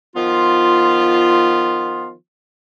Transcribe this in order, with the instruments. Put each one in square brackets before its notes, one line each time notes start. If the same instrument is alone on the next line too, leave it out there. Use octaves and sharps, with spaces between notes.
[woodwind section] D#3 F3 B3 F4